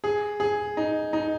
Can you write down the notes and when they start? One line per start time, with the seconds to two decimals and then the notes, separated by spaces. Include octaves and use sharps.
0.04 G#4
0.40 G#4
0.77 D#4
1.13 D#4